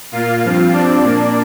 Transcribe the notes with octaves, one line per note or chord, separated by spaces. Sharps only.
A#2 A#3 F4 F5
G2 F3 C4
G2 F3 C4 D4 D5
A#2 A#3